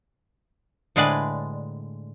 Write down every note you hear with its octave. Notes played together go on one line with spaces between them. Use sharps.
A2 D3 G#3 G#4 B4 D5